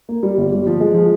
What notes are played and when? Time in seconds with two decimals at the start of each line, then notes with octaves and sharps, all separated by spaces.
0.09 A#3
0.23 G3
0.38 G1
0.52 G3
0.67 F3
0.80 G#3
0.95 F3